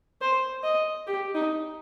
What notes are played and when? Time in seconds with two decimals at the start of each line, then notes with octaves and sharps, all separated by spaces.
0.21 C5
0.63 D#5
1.07 G4
1.34 D#4